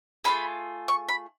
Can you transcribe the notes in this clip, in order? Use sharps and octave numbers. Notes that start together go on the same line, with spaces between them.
A3 C#4 F4 G#4 B5
C#6
B5